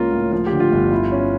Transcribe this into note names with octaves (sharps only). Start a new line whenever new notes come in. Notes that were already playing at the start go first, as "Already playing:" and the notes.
Already playing: C#2 A#3 C#4 F4 A#4
A2
F3 F4
G4
D3
F4
G1
E4
C#4